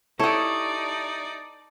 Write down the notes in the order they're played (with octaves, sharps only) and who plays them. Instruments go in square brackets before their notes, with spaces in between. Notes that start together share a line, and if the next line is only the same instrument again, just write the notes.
[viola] D#4 D5 [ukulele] E4 G4 [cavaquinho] A4 D#6 [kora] C#5